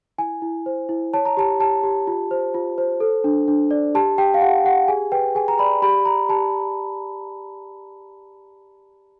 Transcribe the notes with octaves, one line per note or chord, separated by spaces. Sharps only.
E4 G#5
E4
C5
E4
C#5 A5
A#5
G4 A5
G4 A5
G4
F4
C5
F4
C5
A4
D4
D4
D5
G4 A5
G4 G5
F5
G4 F#5
G4 F#5
G#4 G#5
B4 G5
G#4 G#5
A#5
D5 B5
G4 B5
G4 A#5
G4 A5